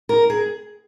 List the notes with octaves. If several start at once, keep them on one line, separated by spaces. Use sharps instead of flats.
A#4
G#4